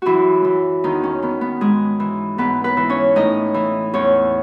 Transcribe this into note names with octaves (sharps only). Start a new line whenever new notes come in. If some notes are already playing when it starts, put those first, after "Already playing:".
F#2 E3 E4 F#4
E3
E2 D#3 D#4
C#4
D#3 B3
B3
G#2 G#3 G#4
E3
G#2 B3 B4
B3 B4
E3
C#4 C#5
A2 D#4 D#5
E3
E2 C#4 C#5